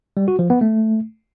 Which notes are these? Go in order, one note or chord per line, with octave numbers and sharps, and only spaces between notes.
G3
F#4
F3
B3
A3